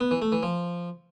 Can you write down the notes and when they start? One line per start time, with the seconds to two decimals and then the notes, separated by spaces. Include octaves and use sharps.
0.01 B3
0.11 E3
0.22 A3
0.32 E3
0.43 F3